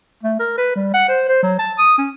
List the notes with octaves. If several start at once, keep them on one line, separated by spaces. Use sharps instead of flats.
A3
A#4
B4
G3
F#5
C5
C5
F#3
A5
D#6
C#4